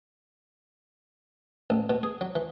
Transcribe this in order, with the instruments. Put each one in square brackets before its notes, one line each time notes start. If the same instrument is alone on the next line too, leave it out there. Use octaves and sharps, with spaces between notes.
[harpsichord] A1
B2
G#4
F#3
E3